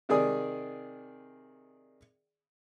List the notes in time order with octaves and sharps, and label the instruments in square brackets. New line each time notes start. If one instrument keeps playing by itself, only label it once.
[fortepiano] C3 D#3 G#4 D5 D#6